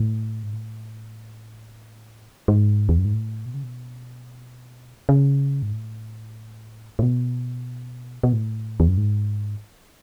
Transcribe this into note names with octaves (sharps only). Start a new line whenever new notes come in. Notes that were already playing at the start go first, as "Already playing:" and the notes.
Already playing: A2
G#2
A2
G#2
E2
F#2
G#2
A2
B2
C#3
B2
C#3
G#2
A2
A2
B2
B2
A2
E2
F#2
G#2